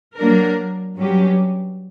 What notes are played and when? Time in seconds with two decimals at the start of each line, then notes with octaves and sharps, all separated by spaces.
0.18 F#3 A#3 D4 A#4
0.97 G2 F#3 C#4 G4